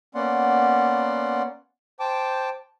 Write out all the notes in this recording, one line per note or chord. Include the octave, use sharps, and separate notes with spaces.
A#3 B3 C#4 D5 F#5 C6
C5 G5 A5 D6